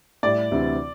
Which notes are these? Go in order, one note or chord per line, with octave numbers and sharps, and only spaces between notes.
A2 G3 E4 G4 D5
D2 C3 E3 C4 E4